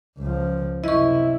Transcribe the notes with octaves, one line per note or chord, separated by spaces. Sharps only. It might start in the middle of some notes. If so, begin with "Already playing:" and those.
C#2 F3
F#2 C3 E4 D#5 C#6